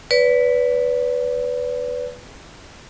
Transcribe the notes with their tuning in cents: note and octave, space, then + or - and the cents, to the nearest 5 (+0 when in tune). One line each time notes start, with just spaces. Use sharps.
B4 +0 D5 -40